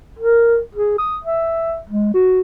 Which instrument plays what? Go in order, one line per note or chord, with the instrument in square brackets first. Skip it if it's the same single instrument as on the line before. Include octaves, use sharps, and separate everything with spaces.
[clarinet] A#4
G#4
D#6
E5
G#3
F#4